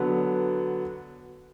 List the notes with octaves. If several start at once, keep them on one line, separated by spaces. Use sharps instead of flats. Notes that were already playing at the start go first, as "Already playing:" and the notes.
Already playing: D3 F#3 B3